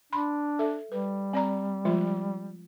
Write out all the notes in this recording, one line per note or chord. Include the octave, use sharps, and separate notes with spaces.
D4 B5 C6
A4 E5
G3 B4
C4 D5 A#5
F3 G#3 F4